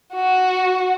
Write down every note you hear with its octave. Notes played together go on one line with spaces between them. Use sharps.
F#4